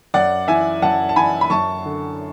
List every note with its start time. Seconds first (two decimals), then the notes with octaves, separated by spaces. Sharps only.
0.14 F#2 D5 F#5
0.48 E3 E5 G#5
0.82 F#2 F#5 A5
1.09 A5
1.16 E3 G#5 B5
1.41 B5
1.50 F#2 A5 C#6
1.85 D3